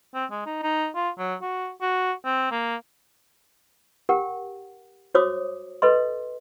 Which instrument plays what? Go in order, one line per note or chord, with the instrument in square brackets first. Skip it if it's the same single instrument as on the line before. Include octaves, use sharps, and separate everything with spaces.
[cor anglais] C4
G#3
D#4
D#4
F4
F#3
F#4
F#4
C4
A#3
[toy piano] G4 A#4 F#5 G5
F#4 C5 C#5 D6 D#6
A4 B4 D#5 C6